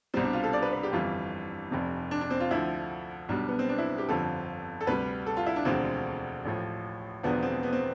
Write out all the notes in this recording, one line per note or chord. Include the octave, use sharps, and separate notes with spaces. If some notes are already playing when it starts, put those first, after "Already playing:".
C2 B2 G3 C4
D4
F4
A4
D5
B4
B4
G4
G1 F2 E3 G3 F4
F1 F2 C3
D4
D4
C4
F4
D2 D3 F3 E4
B1 B2 G3 D4
B3
C4
D4
E4
G4
G1 F2 D3 F3 A4
A4
D2 C3 G3 B4
A4
F4
E4
D4
E1 D2 D3 F3 C4
A1 A2 F3
E1 E2 D3 F3 B3
C4
B3
C4